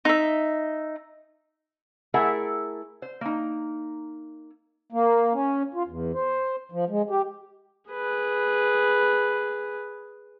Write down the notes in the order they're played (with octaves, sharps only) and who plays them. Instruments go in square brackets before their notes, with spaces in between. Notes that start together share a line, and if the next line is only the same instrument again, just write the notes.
[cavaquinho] D#4 E5
[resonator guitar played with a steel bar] A3 E4 G#4 A#4 E5 F#5
C5
A#3 D#4
[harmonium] A#3
C#4
F4
E2
C5
F3
G#3
G4
[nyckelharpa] G#4 B4